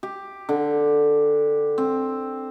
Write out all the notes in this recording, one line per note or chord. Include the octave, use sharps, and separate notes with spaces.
G4
D3
C4